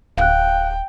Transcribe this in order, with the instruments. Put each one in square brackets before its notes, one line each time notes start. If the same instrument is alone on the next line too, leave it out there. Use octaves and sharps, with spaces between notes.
[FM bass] D1 [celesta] F5 F#6 [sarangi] G5